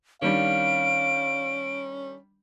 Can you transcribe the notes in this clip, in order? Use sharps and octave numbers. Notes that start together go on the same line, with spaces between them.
D#3 G3 C#4 D4 F5 D7